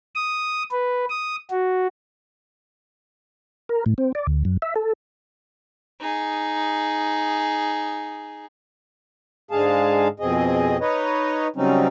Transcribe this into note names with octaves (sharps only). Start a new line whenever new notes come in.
D#6
B4
D#6
F#4
A#4
A2
C4
D5
D2
F#2
E5
A4
D#4 G#4
G#2 D3 G#3 G#4 F5 A5
F2 B2 C4 G#4 D#5
D#4 B4 C#5 D#5
C#3 F#3 G3 C4 C#4 D#4